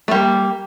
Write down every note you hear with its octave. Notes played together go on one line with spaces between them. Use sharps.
G3 A3 A#3